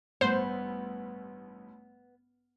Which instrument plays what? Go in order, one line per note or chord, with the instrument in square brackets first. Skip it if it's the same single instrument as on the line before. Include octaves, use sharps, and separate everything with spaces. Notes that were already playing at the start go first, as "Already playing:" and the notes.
[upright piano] A1 G2 [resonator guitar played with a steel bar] B3 [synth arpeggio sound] C5